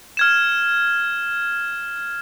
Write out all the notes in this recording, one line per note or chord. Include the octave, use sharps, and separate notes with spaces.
F6 G#6 E7